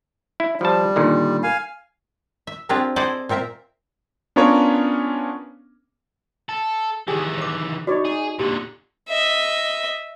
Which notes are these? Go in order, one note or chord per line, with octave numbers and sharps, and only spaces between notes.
E4
F3 G3 A5
A#2 D3 D#3
F5 G#5
E5
C4 D4 F4 G4 G#4 A#4
E4 G#4 A4 C5 D5 D#5
A#2 C4 A#4 E5 A#5
B3 C#4 D4 F4 A#4 C#5
A4
D#3 E3 G4 G#4 G#5
C#5 D6
D#4 F#4 C#5 D5
D#4 G#4
A#2 D3 G4
D#5 E5